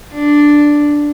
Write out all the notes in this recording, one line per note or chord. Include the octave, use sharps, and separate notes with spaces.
D4